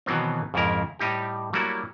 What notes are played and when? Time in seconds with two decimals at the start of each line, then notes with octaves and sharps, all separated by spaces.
0.06 B2 D#3 E3 F#3 B3 C4
0.54 F2 G#2 C#3 F3 E4 A#4
0.99 A2 G3 D#4 G4
1.53 F#3 G3 A3 A#3 E4 F#4